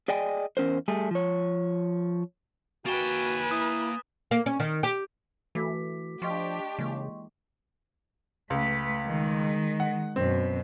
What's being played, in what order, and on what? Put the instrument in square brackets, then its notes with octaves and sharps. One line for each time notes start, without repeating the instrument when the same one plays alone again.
[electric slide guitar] G#4 D5 D#5 G5 G#5
E2 C#4 A#4 C5
G3 A3 G#4
F3 C#5
[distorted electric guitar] A#3 G5 [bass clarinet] F#4 [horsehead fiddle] B4 G#5 [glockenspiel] A6 E7 G7
[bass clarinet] E4 [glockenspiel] D#6
[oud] A#3
C#4
D#3
G4
[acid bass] E3 [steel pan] A3 A4 [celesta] F#4 D6 B6
[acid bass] F3 [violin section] D4 G4 [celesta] D#5 C6 C#6
[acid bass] C#3 [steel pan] E3 G#3 A#3
[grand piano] C#2 [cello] A3 B4
[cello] D#3 G#3
[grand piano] F#5
[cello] F#2 B2 [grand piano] C4